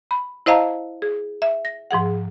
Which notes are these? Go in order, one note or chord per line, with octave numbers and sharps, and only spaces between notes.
B5
E4 C5 D#5 F5 A5 A#5
G#4
E5
A#6
G#2 F3 G#4 F#5